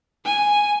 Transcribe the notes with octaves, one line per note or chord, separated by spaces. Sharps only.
G#5